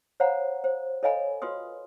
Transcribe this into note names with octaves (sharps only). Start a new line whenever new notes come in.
C5 C#5 F5 F#5 A#5 B5
C5
A4 C#5 D#5 F5 G#5 B5
F4 F#4 B4 C6 D#6